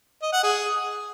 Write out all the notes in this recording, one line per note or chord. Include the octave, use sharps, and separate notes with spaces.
D#5
F#5
G#4